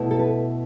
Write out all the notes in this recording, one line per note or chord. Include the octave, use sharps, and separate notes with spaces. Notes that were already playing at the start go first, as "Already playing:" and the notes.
Already playing: B2 A3 E4
A4
B4